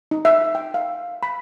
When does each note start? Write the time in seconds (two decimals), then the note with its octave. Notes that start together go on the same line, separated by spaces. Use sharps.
0.11 D#4
0.25 E5
0.55 G5
0.74 F5
1.23 B5